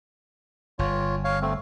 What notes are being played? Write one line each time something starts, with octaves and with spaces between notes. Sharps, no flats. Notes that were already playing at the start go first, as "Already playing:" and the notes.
G1 F4 C#5
C#5 F5
A3 C4